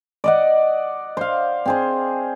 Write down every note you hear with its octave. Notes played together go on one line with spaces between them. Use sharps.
D5 D#5 F#5
C5 F5
C4 G#4 C5